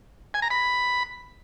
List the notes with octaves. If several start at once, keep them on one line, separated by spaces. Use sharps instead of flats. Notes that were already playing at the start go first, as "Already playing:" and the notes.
G#5
A#5
B5